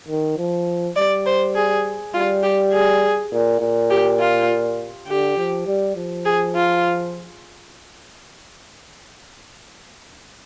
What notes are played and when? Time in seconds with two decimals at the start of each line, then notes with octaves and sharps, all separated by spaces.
0.08 D#3
0.37 F3
0.96 G3 D5
1.26 C5
1.55 G#4
2.14 G3 F4
2.43 G4
2.73 G#4
3.32 A#2
3.60 A#2
3.90 G4
4.20 F4
5.08 D3 G4
5.37 F3
5.67 G3
5.96 F3
6.25 G#4
6.56 F4